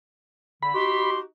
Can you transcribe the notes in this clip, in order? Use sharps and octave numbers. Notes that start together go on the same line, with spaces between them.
D3 B5
D#4 F#4 G4 C6